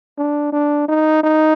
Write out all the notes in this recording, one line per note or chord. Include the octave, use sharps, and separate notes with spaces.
D4
D4
D#4
D#4